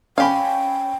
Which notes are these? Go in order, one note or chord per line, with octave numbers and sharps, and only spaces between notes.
C#4 G4 F5 G5 G#5 B5